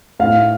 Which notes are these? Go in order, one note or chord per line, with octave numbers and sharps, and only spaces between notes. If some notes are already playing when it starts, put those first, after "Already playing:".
A2 F5